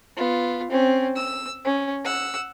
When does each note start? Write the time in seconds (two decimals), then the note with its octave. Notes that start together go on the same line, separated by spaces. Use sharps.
0.16 B3 F4
0.70 C4 C#4
1.16 E6
1.65 C#4
2.05 F#5 E6